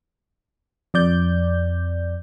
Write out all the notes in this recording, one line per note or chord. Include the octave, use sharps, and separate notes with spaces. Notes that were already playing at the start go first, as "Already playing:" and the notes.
F2 D5 G6